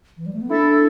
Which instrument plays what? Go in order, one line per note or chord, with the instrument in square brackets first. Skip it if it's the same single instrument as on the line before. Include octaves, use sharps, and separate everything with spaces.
[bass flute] E3
G3
A3
B3
[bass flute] D4 [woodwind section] E4 A4